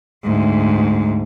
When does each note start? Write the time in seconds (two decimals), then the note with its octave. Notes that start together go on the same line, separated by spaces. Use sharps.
0.24 D2 G#2